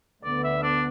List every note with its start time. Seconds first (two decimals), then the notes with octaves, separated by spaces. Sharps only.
0.24 D2 D3 B3 D5
0.44 E5
0.63 D4